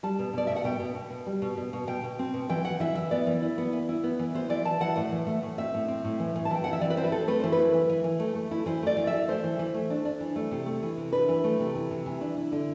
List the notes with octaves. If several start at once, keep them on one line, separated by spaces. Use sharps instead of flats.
G3 A5
B2
B2 D5
B2 E5
F#5
B2 G5
B2
B2
B2
G3
B2
B2
B2
B2 G5
B2
C4
B2
E3 G5
E3 F#5
E3 E5
E3 E5
B3 D5
E3
E4
B3
E3
E4
B3
E3
B3 C5
E3 D5
E3 A5
E3 F#5
A2 F#5
E3
A3
A2
C4 E5
A2
C4
A2
E3
E3
A5
E3 G5
C4 F#5
E5
E3 D5
B4
C4 C5
B4
C4 A4
A3 B4
E3 C5
B4
E4
E3
E3
E3
A3
A3
E4
E3 C5
A3 D5
E3
E5
E3
A3 C5
E3
E3
A3
D4
D4
E3
A3
C3
A3
E3
C3
D4 B4
E3
A3
C3
E3
C3
E3
D4
E4
D3